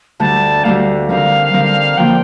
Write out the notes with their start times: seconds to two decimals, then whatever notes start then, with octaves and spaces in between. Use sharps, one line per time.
0.20 D2 D3 G3 A5
0.64 D2 D3 G3 F5
1.09 D3 G3 C4 D#4 A#4 F5
1.53 D3 G3 C4 D#4 A#4
1.97 D3 F3 A#3 F4 G5